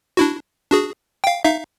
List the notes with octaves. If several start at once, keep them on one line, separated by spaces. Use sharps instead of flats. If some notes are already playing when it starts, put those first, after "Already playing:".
D4 E4 F#4
D4 F#4 G#4
F5 G5
D#4 E5 F5